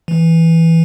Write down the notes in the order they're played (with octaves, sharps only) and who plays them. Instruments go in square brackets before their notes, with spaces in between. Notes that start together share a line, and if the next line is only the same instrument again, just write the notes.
[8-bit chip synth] E3